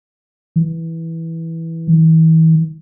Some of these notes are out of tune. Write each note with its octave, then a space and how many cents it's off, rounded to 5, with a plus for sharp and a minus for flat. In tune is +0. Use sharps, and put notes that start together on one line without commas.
E3 -10
E3 -40